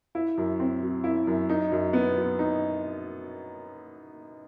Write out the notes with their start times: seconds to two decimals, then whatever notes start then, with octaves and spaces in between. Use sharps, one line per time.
0.15 E4
0.37 F#2
0.60 C4
0.82 F#3
1.04 E4
1.27 F#2
1.49 D#4
1.72 F#2
1.93 B3
2.17 F#3
2.39 D#4